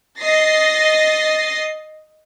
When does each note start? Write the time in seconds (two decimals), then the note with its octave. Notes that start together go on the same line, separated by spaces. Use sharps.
0.21 D#5 A6 A#6 C7